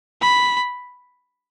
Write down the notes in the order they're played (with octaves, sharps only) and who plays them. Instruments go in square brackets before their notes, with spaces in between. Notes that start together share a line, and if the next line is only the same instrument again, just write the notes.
[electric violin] B5